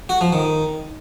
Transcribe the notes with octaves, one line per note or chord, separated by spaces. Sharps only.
F#4
F3
D#3